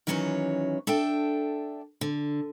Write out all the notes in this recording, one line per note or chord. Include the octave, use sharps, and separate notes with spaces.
D#3 E3 F#3 C#4 B4 C#5
D4 A4 E5 G5
D3